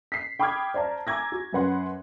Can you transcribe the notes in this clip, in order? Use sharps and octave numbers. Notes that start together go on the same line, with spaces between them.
B6 C7
G5 B5 D6 D#6 F6 G#6
C5 D5 A5 A#5
G#5 A#5 D6 E6 G#6 A#6
F#4
F#2 C#4 B4 F#5 C6